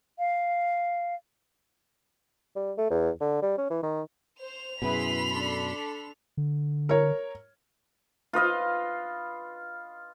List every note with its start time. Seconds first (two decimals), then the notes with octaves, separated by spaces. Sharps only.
0.19 F5
2.56 G3
2.78 A3
2.90 E2
3.21 D3
3.42 G3
3.58 C#4
3.70 E3
3.83 D#3
4.41 C5 F7
4.82 F#2 B2 E4 G#4 B4 B5 C6
5.29 D4 A4
6.37 D3
6.89 A#4 C#5
8.33 F4 B4 D#5 F5